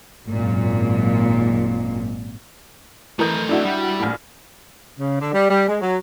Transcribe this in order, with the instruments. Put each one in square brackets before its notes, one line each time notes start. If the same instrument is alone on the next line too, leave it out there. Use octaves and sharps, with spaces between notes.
[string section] G#1 F#2 A#2
[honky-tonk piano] E3 A#4 G6 [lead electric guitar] A3 D#5
[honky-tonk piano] D4 E4 F#4
[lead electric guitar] G3
[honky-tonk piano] A#1 A2
[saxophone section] C#3
D3
G3
G3
G#3
F#3